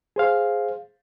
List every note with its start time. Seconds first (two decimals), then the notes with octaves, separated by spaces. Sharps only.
0.16 G#4 C5 F5